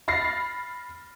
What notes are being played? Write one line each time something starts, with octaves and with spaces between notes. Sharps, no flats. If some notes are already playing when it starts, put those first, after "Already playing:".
B5 F6 A6 A#6 C7